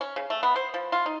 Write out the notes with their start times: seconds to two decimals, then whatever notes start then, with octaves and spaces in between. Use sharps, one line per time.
0.01 C#4
0.16 C#3
0.30 A3
0.43 B3
0.56 C5
0.74 F3
0.92 F4
1.06 D#4